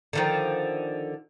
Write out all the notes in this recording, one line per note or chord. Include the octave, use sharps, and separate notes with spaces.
D3 D#3 F3